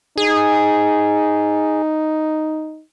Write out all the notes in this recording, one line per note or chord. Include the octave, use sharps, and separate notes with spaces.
D#4 G#4